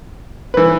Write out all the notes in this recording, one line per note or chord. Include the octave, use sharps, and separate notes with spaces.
E3 B4